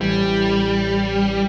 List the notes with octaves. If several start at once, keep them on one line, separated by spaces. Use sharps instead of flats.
A1 E3 G3